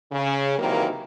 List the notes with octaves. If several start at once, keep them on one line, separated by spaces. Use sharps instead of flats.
C#3
C3 D#3 E3 F#3 A#3